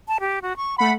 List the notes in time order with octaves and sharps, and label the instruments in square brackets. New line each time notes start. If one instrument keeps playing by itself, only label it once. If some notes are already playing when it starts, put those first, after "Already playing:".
[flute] A5
G4
F#4
C#6
[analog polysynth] A3 B5 [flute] F#5